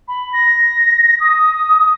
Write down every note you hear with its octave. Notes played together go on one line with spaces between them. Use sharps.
B5
A#6
D#6